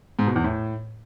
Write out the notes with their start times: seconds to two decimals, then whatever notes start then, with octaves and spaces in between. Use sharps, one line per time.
0.19 G#2
0.27 B2
0.36 E2
0.44 A2